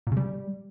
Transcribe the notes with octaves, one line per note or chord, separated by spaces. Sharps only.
A#2
C#3
G3